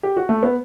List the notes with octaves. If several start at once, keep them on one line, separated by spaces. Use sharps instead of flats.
G4
F#4
A3
B3